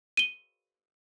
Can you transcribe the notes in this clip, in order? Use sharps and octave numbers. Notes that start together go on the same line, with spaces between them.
D#7 G7